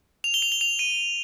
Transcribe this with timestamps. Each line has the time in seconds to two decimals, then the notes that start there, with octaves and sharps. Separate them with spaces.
0.24 F7
0.34 G7
0.42 F7
0.52 G7
0.61 F7
0.79 D#7